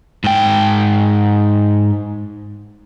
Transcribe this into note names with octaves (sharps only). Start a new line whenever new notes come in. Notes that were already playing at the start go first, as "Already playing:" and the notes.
G#2 G5